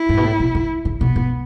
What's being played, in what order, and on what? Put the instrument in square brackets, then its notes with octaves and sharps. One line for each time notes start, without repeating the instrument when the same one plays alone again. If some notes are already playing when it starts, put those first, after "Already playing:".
Already playing: [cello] E4
[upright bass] G#2
B2
A2
B2
D3
C#3
[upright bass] B2 [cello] B3
[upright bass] B2